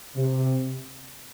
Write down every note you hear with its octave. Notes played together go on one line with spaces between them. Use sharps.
C3